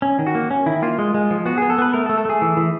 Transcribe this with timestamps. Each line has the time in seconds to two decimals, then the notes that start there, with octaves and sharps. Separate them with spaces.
0.02 C#4
0.19 D#3
0.27 F#4
0.35 A#3
0.51 C#4
0.66 D#3 E4
0.82 A#3 F4
0.99 G#3
1.14 G#3
1.31 F3
1.46 B3 F#4
1.58 B3 G#4
1.70 A4
1.78 B3 B4
1.93 A3 A#4
2.06 A4
2.09 A3
2.18 A4
2.25 A3 G#4
2.42 E3
2.57 E3